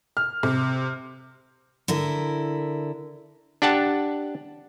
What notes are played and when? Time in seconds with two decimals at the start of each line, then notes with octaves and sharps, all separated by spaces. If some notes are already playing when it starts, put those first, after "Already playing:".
0.17 F6
0.43 C3
1.88 D3 E4 A#4
3.62 D4 G4 F#5 A5